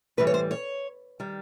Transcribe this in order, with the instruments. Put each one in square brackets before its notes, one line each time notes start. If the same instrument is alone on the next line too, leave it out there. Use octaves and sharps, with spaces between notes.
[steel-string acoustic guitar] A2 E3 G3 B4
C#5
C5
C#5
D#3 G3